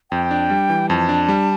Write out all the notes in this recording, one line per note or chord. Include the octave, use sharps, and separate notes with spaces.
F2 G5
D4
G3
E3
F2 A5
D4
G3